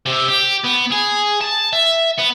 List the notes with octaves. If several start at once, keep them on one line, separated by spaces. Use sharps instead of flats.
C3
G4
B3
G#4
A5
E5
B3